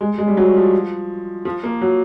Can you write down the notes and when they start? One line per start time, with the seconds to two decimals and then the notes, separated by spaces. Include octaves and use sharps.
0.01 G#3
0.18 G#3
0.27 G3
0.37 F#3
0.55 F3
1.45 F3
1.63 A#3
1.81 F#3